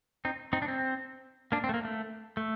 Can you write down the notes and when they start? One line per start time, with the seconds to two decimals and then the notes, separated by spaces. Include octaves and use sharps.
0.25 C4 D#4
0.53 C4 D#4
0.62 D4
0.68 C4
1.52 A#3 D4
1.64 C4
1.69 A3
1.74 A#3
1.85 A3
2.37 A3